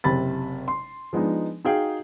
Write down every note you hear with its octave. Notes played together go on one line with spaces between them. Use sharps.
F#1 C3 B5 A6
C6
F3 G#3 B3 D4 D#4
D#4 F#4 G#4 F5 G5